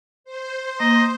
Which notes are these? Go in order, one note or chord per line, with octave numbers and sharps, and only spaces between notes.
C5
A#3 D#5